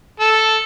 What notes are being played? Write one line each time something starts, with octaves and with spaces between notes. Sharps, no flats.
A4